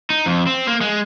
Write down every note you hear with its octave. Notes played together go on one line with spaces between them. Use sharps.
D#4
F2
C4
A#3
G#3